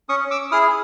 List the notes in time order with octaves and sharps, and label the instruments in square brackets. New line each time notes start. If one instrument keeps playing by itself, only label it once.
[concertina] C#4 C#6 D#6
D6 E6
E4 G#4 D#6 F6